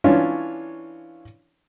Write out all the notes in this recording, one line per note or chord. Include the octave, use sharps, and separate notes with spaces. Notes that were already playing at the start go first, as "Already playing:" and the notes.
E3 C#4 D4 F4 C#5